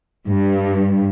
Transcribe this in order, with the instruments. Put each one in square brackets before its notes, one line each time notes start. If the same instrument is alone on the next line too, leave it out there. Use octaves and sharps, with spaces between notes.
[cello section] G2